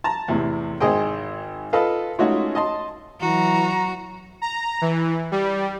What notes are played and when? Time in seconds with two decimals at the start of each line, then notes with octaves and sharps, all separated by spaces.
0.04 A5 A#5
0.28 E2 A2 C3
0.80 G#1 G#4 C5 D#5 G5
1.73 F4 A4 B4 D#5 F5
2.19 G#3 A3 C#4 D#4 F4 F#4
2.55 D#5 A5 C6
3.21 E3 F#3 F#4 A#5
4.42 A#5
4.81 E3
5.32 G3